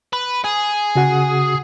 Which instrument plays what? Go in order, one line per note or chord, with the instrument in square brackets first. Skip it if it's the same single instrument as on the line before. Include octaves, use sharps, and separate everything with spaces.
[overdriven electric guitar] B4
G#4
[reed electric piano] C#3 F#4 F#5